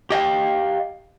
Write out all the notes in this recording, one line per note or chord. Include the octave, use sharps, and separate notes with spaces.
G4 D#5 F5 G5